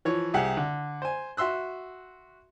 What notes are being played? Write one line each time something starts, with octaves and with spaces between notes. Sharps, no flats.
E3 F3 C#5
C2 G4 G#4 F#5 F#6
D3
C5 G#5
F#4 E5 C6 E6 F#6